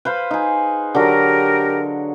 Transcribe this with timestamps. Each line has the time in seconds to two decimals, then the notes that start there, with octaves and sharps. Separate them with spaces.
0.05 B4 C5 F5
0.31 D#4 G#4
0.95 D3 F#3 G4 A#4